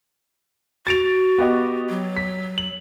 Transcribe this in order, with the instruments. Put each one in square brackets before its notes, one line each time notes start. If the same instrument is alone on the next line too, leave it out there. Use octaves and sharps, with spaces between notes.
[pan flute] F#4 [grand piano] A6 D7 F7
[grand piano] B3 G4 D#5
[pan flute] F#3
[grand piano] B6
F#7